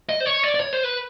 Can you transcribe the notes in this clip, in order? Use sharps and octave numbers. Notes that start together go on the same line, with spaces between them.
D#5
C5
C#5
D5
D5
C#5
C5
B4